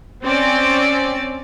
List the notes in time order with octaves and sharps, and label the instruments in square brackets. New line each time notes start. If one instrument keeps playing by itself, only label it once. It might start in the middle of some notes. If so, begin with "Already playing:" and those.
[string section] C4 C#4 D5